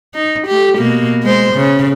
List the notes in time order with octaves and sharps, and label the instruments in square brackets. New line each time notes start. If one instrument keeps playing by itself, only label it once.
[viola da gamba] D#4
A3 G4
B2 A#3
G#3 C5
C#3